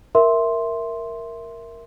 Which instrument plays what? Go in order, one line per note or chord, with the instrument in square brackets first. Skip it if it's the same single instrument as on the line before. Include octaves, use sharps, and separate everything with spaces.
[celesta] A#4 E5 C6